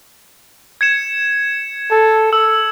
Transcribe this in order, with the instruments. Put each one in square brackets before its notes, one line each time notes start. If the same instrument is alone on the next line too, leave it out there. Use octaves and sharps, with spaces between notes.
[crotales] G#6 C#7 E7
[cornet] A4
[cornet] A4 [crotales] E6